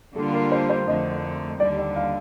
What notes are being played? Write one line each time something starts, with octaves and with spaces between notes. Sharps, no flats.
D3 G3 A#3 D4 F4 A4
A#4
C5
C5
F2 D3 A3 D#5
D#2 D3 G3 D5
D5
F5